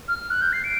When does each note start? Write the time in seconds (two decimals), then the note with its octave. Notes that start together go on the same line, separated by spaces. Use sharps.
0.08 F6
0.30 F#6
0.42 G6
0.53 C7
0.64 D7